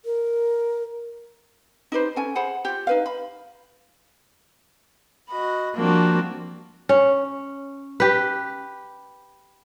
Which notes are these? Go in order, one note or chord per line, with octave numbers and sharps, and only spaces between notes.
A#4
D#4 G4 B4 C5
C#4 A4 G#5
G#4 C5 F#5 B5
F4 G4
D#4 B4 F5
B5
F#4 D#5 B5
F3 G3 A#3 C4 D4 F#4
C#4
G4 B4